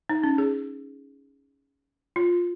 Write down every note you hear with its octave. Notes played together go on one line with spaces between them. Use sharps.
D#4
C#4
G#4
F4